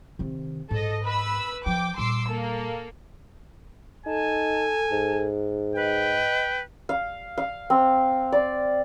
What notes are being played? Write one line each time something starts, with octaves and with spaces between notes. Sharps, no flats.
C3 D#3
G#2 A4 D#5
B4 B5 E6
F3 G5 D6
A#2 G3 C6 D6 E6
A#3 A4
D#4 A4 G#5 A5
G#2
B4 D#5 G5
F5
F5
C4
D5